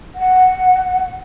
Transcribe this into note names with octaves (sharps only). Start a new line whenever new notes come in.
F#5